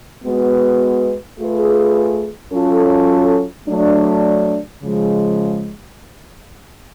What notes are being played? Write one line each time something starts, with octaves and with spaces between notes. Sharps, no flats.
G#3 B3 F#4 B4
A3 F4 G#4 B4
F#3 C#4 F4 A4
F#3 A3 D4
C#3 F3 G#3